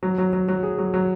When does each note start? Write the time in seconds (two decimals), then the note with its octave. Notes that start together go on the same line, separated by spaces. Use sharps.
0.03 F#3
0.18 F#3
0.33 F#3
0.48 F#3
0.63 G#4
0.78 F#3
0.94 F#3